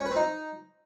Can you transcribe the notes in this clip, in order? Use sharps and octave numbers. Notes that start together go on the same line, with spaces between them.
C#4
B4
C4
D#4